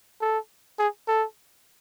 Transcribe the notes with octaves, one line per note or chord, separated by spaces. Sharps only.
A4
G#4
A4